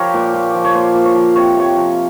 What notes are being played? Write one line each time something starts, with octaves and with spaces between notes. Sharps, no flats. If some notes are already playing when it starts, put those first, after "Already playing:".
Already playing: F3 G4 A#4 C#5
A#2
A#2
F3
C#5
A#2 C5
A#2
C#5
F3
C3 C#5
C3 C#5
F3